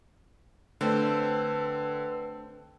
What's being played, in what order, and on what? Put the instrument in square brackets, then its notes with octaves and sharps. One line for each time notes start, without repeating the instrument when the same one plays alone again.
[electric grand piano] D3 [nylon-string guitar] A3 D4 D5 [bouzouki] C4 [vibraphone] B4 A5 E6